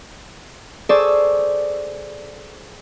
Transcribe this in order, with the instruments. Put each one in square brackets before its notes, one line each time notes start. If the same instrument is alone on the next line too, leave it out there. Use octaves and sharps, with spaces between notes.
[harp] G#4 A4 C5 D5 C#6 E6